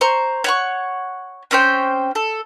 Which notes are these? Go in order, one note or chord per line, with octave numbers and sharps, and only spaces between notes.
C5 A#5 C#6
C#5 F#5 C#6
C4 C#4 C5 G5
A4